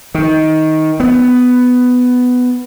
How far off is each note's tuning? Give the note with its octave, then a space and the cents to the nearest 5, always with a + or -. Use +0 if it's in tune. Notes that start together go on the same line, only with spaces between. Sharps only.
D#3 +15
B3 +10